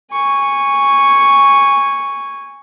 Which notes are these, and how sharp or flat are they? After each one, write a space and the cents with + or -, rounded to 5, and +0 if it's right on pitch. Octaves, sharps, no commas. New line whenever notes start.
G#5 -15 C#6 +0